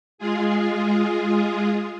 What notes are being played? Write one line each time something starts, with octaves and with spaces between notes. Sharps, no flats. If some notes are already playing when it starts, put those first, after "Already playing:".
G#3 F4 G#4